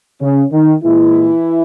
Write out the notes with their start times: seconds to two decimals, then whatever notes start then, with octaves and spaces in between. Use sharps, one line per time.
0.20 C#3 C#4
0.51 D#3 D#4
0.83 A#2 E3 G#3 E4